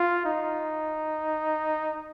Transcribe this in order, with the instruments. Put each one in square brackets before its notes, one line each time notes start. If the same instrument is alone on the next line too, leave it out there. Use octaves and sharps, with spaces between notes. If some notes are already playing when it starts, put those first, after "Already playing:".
Already playing: [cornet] F4
D#4